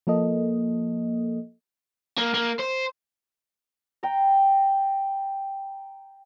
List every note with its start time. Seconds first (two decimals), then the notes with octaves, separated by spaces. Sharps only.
0.07 F3 A#3 A4 D#5
2.18 A#3
2.34 A#3
2.59 C5
4.03 G5 A#5